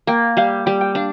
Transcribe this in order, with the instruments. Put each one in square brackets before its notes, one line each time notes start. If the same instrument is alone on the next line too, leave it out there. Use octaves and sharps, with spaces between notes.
[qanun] A#3 [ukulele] G5
[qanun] G3 [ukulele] F5
[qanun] G3 [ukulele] G5
[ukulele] G5
[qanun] D4 [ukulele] F5